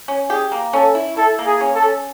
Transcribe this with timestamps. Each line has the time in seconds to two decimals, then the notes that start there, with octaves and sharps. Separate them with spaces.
0.08 C#4
0.30 G4 G#4
0.52 A#3
0.73 C#4 A4
0.95 E4
1.17 E4 A4
1.39 A#3
1.46 G#4
1.61 C#4
1.75 A4
1.82 C#4